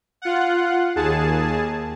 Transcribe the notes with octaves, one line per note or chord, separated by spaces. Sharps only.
F4 F#5
D#2 G#4 A5